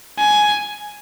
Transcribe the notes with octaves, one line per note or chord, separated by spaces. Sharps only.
G#5